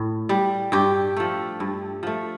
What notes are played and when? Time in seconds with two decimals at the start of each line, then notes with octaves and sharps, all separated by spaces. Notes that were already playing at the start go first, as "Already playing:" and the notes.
Already playing: A2
0.29 G3
0.72 G2 G4
1.17 F3 A3
1.60 G2
2.03 F3 A3